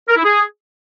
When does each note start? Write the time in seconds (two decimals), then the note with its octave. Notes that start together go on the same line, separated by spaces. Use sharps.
0.08 A#4
0.16 E4
0.24 G#4